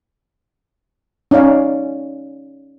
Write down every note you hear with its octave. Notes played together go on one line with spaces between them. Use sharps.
C#4 D#4 D5 F5